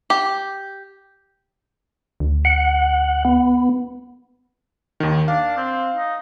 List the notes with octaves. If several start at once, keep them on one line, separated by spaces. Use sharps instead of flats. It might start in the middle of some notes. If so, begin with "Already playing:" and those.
G4
D2
F#5
B3
D#2 D#3
D4 F5
C4
D#4